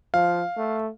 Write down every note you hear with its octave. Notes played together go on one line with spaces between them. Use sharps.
F3 F5
A3